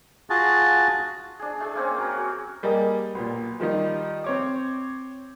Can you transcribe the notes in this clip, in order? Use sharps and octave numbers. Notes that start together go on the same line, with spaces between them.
F4 F#4 G#4 A5
D4 G#4
A3 G#4
A#3 C4 C#4
F#3 A#4
F#4
G3 A#3 G#4 D#5
B1 A#2
D#3 F3 G3 D#4
C4 C#5 D6